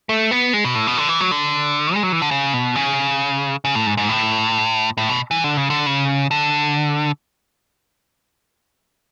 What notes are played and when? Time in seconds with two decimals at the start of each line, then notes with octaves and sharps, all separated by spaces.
0.09 A3
0.31 B3
0.53 G#3
0.65 B2
0.75 A2
0.87 B2
0.98 D3
1.09 E3
1.20 F#3
1.31 D3
1.94 G#3
2.03 F#3
2.12 E3
2.22 D3
2.31 C#3
2.54 B2
2.75 C#3
3.65 C#3
3.75 A2
3.86 G#2
3.97 G#2
4.09 A2
4.97 A2
5.09 B2
5.31 E3
5.44 D3
5.57 C#3
5.70 D3
5.86 C#3
6.31 D3